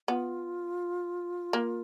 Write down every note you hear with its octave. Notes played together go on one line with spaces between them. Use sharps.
B3 F4
A#3